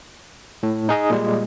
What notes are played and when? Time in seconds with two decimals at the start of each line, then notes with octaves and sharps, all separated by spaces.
0.63 A2
0.89 D#4 G#4 D#5
1.10 A#2 G3 G#3